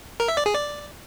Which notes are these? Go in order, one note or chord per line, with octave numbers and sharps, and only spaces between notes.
A#4
E5
D5
G#4
D5